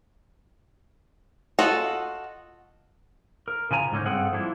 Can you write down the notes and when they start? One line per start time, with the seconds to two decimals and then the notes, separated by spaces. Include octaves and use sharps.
1.59 F4 F#4 A4 D#5 F#5
3.48 A#4
3.71 C#3 F3 G#5 A#5
3.92 G#2 D3 C#4 D#4
4.06 G2 C4 G#4 A4 F#5
4.33 F3 A#3 D4 E4